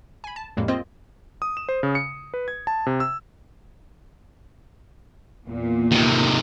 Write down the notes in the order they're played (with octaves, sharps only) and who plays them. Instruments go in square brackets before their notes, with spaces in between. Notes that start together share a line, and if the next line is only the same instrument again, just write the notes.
[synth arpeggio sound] G#5 B5
A5
F2 A2 G3 G#3 A#3
A#3 C4 F4 C5 D#5
[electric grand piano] D#6
E7
C5
C#3
C#7
B4
G#6
A5
C3
E6
[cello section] E2 A#2
[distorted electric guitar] C3 D#3